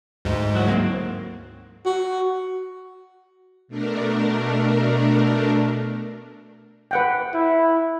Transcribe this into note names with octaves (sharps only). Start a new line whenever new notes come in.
D2 G#2 G#3
F#3 E4 F#4
F#3 A#3 C4
F#4
B2 A3 D4 A#4
B4 F#5 G5
E4